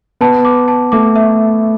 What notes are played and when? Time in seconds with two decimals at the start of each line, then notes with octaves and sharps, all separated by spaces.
0.21 B3 A5
0.45 D6
0.68 A5
0.92 A3 D6
1.16 E5